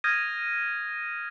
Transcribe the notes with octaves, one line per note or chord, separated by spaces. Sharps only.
D#6 F6 G6 G#6 A#6 D#7